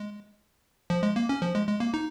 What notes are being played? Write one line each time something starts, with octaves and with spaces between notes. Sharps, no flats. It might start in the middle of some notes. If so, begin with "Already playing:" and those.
Already playing: G#3
F3
G#3
A#3
C#4
F3
G#3
G#3
A#3
D#4